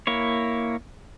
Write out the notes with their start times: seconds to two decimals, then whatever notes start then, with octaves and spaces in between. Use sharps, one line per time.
0.07 A#3 E4 C#5